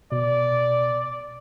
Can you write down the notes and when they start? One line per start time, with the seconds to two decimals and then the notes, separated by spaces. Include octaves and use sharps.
0.12 B2 D5